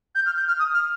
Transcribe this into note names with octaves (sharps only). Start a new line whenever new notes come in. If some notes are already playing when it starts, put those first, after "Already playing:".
G6
F6
G6
F6
D#6
F6